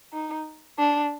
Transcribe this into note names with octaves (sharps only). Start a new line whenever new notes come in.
D#4
D4